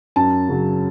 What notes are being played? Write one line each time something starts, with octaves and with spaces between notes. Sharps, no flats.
F#2 A5
C#3 F#3